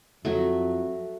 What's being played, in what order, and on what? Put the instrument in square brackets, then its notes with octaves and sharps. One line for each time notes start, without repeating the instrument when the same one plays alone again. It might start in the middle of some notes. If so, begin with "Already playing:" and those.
[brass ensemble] F2 [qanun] F#3 A3